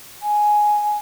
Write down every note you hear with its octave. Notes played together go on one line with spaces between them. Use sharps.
G#5